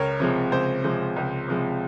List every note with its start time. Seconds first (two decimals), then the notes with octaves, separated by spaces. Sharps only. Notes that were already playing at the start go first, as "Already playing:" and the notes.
Already playing: C#2 A#4 C#5
0.20 C3 F3 G#3
0.52 C#2 C5
0.84 C3 F3 G#3
1.16 C#2
1.48 C3 F3 G#3